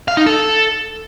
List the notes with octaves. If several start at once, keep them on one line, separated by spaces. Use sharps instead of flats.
F5
D#4
A4